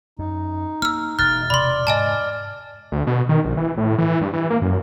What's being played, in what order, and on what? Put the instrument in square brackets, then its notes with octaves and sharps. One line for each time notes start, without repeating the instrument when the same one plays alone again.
[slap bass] F#2 [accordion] D#4
[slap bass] A#3 [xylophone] E6 F6
[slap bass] E1 [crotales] F6 A6 [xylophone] F#6
[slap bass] E1 C3 [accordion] D5 [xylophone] B5 C6
[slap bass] G#2 [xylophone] D#5 G#5 A5
[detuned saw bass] D2
B2
D#3
A#1
E3
A2
E3
G2
E3
A#3
F#2